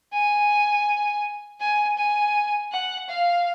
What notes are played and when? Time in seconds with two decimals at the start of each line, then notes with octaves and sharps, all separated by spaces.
0.13 G#5
1.60 G#5
1.98 G#5
2.72 F#5
3.09 F5